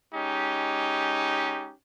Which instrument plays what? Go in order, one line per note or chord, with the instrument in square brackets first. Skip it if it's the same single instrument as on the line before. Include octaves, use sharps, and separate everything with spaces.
[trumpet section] G#3 C#4 D#4 G4